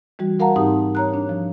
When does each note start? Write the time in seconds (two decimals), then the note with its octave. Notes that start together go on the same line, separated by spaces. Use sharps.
0.19 E3 G3 F#4
0.39 F#4 A#4 F5 F#5 A5 A#5
0.56 G#2 C4 D#4 G4 D#6
0.95 C#5 A#5 F#6
1.14 D4
1.29 F3